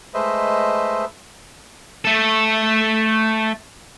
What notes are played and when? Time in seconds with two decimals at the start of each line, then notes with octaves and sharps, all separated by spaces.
0.14 G#3 A3 B4 C5 D#5 E5
2.05 A3 A4